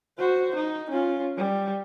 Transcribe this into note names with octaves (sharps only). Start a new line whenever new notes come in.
F#4 C5
D#4
C#4 F4
G3